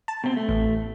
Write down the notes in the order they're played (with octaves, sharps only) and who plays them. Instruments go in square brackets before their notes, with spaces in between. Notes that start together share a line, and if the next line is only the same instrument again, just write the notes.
[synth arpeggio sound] A5
[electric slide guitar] B2 C4
A3
[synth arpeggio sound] A1